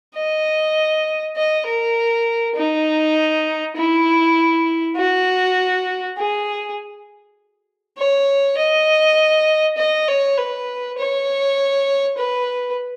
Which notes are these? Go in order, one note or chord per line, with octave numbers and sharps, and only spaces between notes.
D#5
D#5
A#4
D#4
E4
F#4
G#4
C#5
D#5
D#5
C#5
B4
C#5
B4